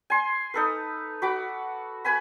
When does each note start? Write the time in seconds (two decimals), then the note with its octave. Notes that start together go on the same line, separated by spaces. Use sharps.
0.10 G#5 C6
0.54 D#4 A4 B4
1.22 F#4 B5 D6
2.05 B4 G#5 B5